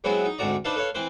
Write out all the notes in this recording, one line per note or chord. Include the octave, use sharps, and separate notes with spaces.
F#3 G#3 B3 C4 E4 F#4
D#4
D2 G#2 C3 F#4 D5 A#5
D4 D#4 B4 C5 F5 A5
A4 B4 C#5 F5
E3 C4 B4 C5